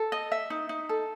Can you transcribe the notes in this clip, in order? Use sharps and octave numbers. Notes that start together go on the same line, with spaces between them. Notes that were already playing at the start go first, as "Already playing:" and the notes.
Already playing: A4
D#5
E5
D#4
D#4
A4